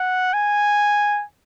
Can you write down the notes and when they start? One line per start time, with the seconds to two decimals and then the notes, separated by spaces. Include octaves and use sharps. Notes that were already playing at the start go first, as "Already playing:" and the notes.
Already playing: F#5
0.34 G#5